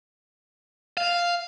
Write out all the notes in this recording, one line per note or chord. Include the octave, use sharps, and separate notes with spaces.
F5